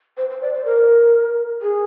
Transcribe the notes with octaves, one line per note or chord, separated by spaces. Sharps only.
C5
C5
D5
C5
A#4
G#4